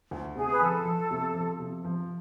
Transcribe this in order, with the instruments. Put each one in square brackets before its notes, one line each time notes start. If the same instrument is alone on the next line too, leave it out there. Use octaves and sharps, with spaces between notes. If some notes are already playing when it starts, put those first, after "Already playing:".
[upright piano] D2
[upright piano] C3 [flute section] G#4
[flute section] B4
[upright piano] F3 [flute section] A4
[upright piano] F3
C3
F3
C3
F3